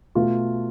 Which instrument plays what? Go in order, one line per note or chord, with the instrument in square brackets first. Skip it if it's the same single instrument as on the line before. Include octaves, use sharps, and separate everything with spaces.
[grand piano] B2 A3 F4